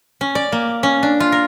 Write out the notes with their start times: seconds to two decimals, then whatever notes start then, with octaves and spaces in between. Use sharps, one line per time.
0.21 C#4
0.35 D5
0.52 A#3
0.83 C#4
1.03 D4
1.20 F4
1.32 A#4